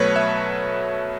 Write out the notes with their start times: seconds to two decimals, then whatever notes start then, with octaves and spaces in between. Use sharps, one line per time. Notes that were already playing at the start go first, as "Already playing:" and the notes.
Already playing: B2 F#3 A3 B4 C#5
0.16 E5